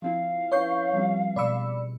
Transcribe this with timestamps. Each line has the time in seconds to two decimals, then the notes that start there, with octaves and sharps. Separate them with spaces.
0.02 F3 C4 E4 F5
0.52 C#4 E4 B4 C#5 C#6 G6
0.93 F3 G3 C4
1.36 B2 G#3 D5 B5 E6 C#7